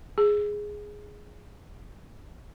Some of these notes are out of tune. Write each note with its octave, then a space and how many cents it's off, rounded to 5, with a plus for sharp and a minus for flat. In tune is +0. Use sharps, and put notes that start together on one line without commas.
G#4 +0